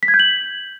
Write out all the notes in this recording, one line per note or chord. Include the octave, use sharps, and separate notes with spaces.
B6
G#6
G6
F#7